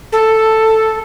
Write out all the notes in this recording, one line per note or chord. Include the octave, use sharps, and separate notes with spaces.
A4